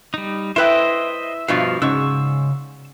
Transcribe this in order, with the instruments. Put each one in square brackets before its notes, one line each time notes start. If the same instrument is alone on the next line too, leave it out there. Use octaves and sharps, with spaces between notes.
[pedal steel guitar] G3 D#4
[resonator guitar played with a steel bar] E4 B4 G5 [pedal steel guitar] C5 D#5 [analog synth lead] E5
[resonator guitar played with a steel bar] G2 B2 F3 [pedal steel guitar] F5
[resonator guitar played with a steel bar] G#2 [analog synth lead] C#3 [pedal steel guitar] C#6 E6